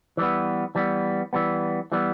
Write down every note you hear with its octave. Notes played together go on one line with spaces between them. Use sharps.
E3 G3 B3
E3 G3 B3
E3 G3 B3
E3 G3 B3